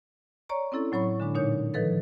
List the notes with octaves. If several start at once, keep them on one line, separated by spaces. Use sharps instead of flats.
C#5 D5 A#5 C#6
C4 C#4 E4 A4
A2 F#3 C#5 B5 C#6
D3 G#3 D4
A#2 D3 D#4 C#5 G6
D#3 F3 A4 B4 A6